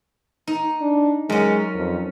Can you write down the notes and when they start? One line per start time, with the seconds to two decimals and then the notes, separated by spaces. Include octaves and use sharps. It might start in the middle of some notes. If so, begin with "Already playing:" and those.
0.47 D#4
0.81 D4
1.30 F#2 G#3 C#4
1.75 F2